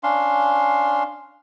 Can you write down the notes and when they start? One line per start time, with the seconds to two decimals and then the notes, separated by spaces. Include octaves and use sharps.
0.03 C#4 D4 F5 C6